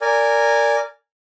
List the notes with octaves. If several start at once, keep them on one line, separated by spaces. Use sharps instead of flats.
A#4 D5 G#5